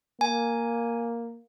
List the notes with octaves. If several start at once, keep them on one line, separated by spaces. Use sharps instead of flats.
A#3 G#5